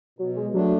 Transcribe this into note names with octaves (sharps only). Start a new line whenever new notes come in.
B2 F#3
G#3
F#3 A3 D4